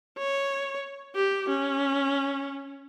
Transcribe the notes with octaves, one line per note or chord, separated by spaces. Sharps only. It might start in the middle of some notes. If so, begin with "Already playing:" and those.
C#5
G4
C#4